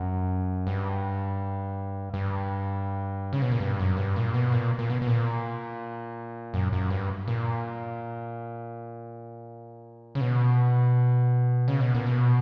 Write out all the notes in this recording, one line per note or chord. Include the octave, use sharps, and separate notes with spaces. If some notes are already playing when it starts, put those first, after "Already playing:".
Already playing: F#2
G2
G2
C#3
B2
A#2
G2
F#2
G2
A#2
B2
A#2
A#2
B2
B2
A#2
F#2
F#2
G2
A#2
C#3
B2
C#3
B2
A#2
B2